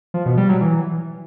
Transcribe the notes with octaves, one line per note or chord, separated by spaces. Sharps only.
F3
B2
G3
F#3
E3